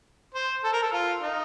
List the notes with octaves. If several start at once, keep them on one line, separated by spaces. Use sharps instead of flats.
C5
A4
A#4
A4
F4
D#4